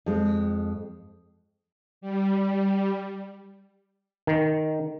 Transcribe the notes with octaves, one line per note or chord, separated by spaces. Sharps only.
F2 G#3
G3
D#3